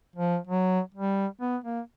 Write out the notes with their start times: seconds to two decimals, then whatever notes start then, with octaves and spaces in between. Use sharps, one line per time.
0.16 F3
0.47 F#3
0.94 G3
1.41 B3
1.64 A#3